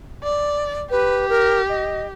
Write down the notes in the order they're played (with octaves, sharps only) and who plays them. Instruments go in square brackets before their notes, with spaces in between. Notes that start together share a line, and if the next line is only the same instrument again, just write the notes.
[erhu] D5
[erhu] G4 [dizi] B4
[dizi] A#4
D#5